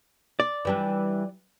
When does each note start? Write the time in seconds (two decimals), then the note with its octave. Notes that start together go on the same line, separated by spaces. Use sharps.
0.40 D5
0.65 E3 G3 D4